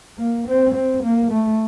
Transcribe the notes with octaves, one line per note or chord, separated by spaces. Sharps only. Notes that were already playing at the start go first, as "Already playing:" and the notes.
A#3
C4
C4
A#3
A3